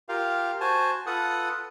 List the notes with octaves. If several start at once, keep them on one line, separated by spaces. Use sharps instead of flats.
F4 G4 A#4 F5
F#4 C5 G#5 A5
F4 A4 B4 F#5 D#6